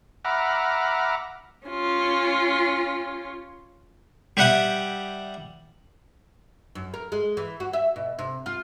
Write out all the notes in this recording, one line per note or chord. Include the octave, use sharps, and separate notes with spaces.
E5 F#5 A#5 B5 D6 F6
C#4 F4
G3 G4 E5 F#5 G5 D#6
F#2
A#4
G#3
E3
F#4
E5
B2
C3
F4